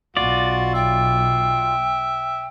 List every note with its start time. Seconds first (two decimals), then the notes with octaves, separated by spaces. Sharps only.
0.17 B1 B2 F4 F#4 D5
0.74 E5 G5